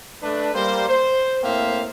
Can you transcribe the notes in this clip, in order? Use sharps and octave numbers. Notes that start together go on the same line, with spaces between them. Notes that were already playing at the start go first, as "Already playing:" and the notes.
A3 D4 B4
G3 A#3 C5
C5
A2 A#3 C4 C5 E5 F5